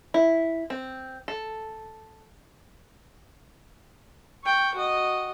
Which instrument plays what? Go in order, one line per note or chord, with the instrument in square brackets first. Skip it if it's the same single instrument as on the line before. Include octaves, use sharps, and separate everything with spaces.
[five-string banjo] E4
C4
A4
[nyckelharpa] G5 C#6
F#4 D#5